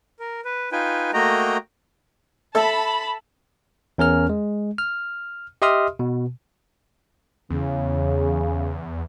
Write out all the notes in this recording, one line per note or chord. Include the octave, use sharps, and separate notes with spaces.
A#4
B4
D#4 F4 B4 G5 G#5
A3 A#3 F#4 D#5 G5 A#5
A4 E5 A5 B5
E2 C#4 A#4 F6
G#3
F6
G4 D#5 E5 C6 D#6 F6
B2
E2 C#3